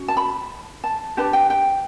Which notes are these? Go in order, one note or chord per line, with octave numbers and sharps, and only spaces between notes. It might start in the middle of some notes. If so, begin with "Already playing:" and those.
Already playing: C#4 F#4
A5
B5
A5
D4 G4 B4 A5
G5
G5